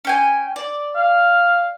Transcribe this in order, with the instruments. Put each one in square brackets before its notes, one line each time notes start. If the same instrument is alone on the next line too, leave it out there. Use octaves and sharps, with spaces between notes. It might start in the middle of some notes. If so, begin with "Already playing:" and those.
[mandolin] C#4 G5 G#5
D5
[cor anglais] F5